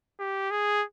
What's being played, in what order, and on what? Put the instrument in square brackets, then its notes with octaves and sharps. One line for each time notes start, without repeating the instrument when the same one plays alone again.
[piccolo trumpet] G4
G#4